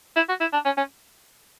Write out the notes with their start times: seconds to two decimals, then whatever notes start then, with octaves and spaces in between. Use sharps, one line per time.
0.16 E4
0.29 F#4
0.41 E4
0.53 D4
0.65 C#4
0.77 C#4